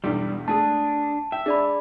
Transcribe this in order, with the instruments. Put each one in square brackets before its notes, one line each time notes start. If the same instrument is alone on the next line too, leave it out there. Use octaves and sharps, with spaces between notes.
[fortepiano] B1 E2 G2 [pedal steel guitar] G3
[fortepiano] A3 G#4 [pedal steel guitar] D4 [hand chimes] A5
[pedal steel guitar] E5 [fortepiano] G5
[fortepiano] D4 [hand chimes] G#4 D5 B5